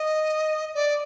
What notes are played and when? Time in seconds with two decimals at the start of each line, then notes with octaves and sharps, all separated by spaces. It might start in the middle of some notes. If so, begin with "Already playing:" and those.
Already playing: D#5
0.74 D5